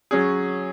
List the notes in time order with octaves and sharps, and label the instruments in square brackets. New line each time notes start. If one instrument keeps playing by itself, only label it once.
[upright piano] F#3 C#4 G#4